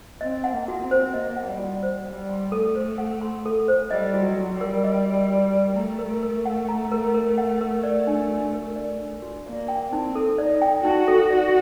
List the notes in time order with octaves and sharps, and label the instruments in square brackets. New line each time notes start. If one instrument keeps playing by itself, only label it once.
[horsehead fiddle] C4 [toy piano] D#5
[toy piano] F#5
[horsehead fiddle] A#3
[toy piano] F#4
[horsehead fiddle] C4
[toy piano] C5
[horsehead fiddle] A#3 [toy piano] D#5
[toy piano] F#5
[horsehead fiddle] G3
[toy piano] F#4
C5
[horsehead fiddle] G3 [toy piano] F#5
[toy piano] C6
[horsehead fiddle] A3 [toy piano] A4
[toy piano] C5
F#5
C6
A4
C5
[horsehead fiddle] G3 [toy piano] D#5
[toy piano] F#4
[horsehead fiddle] F#3
[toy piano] F#4
[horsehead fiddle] G3
[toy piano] A#4
D#5
F#4
F#4
A#4
[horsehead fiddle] A3 [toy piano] A#5
[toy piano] A#4
A#4
F#5
A#5
A#4
A#4
F#5
A#4
D5
D4
F#4
A#4
D5
D4
F#4
[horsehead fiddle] A#3 [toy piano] D5
[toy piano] G5
[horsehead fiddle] C4 [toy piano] D#4
[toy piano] A4
[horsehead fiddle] D#4 [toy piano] D5
[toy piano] G5
[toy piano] D#4 [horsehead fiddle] F#4
[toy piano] A4
D5